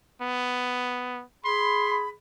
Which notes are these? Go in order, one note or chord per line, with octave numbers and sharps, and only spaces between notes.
B3
G#4 B5 C6